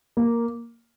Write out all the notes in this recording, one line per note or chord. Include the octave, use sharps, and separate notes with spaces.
A#3